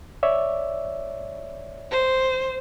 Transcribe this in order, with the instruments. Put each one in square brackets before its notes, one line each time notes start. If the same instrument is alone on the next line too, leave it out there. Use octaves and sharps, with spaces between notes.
[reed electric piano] C#5 D5 E5
[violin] C5